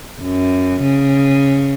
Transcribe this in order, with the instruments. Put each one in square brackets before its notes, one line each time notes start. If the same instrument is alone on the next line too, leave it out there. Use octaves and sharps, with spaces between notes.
[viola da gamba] F#2
C#3